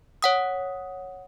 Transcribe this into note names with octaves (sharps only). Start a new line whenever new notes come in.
C#5 F#5 D#6